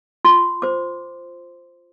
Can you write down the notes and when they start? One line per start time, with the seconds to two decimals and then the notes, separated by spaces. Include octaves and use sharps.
0.25 F4 C6
0.62 C5 D6